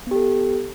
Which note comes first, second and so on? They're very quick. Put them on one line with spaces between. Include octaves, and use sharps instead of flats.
B3 G4 A4